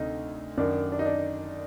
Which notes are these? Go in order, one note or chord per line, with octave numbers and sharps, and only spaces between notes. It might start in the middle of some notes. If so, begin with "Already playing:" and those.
Already playing: D2 C3 D#4
F#2 D#3 D4
D4
D#4
D4